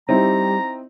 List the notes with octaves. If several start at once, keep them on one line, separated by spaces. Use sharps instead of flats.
G3 C4 D#4 E4 A#5